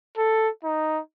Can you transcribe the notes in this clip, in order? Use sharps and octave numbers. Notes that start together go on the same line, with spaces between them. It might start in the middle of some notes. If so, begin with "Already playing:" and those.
A4
D#4